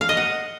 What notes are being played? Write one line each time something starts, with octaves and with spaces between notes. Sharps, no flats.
F5
D#5
F#5